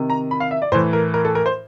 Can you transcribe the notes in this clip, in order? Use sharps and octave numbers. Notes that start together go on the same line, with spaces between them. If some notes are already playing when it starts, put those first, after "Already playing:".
Already playing: C3 D#3
A#5
B5
F5
E5
D5
A2 E3 C5
A#4
A#4
A4
A#4
C5